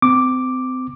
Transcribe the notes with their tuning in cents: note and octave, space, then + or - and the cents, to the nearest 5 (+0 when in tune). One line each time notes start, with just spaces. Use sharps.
C4 -30 D6 +0